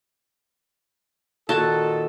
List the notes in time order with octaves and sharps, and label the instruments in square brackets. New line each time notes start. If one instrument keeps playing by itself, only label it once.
[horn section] A#2 D#3 A4 [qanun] F#4 A5